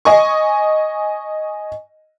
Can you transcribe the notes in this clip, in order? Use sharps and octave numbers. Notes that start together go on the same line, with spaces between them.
D#5 G#5 C#6